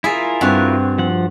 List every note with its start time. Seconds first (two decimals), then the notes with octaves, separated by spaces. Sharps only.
0.04 E4 F4 G#4 A#4 E5
0.41 G2 C4 F#4
0.99 F3 F#5